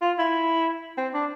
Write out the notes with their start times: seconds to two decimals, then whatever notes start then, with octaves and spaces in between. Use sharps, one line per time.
0.01 F4
0.19 E4
0.97 C4
1.14 D4